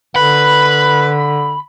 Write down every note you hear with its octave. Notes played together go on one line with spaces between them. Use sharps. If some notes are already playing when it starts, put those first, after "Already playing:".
D3 B4 B5